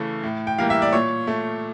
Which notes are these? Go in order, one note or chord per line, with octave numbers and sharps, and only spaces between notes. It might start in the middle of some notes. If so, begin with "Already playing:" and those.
Already playing: C#3 E3 A3
A2
G5
E3 G3 A#3 F5
E5
D5
A#2 C#5
A3